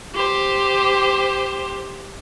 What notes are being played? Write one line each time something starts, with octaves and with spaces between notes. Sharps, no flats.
G4 C5